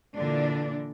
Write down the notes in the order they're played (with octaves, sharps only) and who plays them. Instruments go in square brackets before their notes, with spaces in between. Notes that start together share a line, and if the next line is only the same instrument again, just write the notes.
[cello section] A#2 D3 E3 D4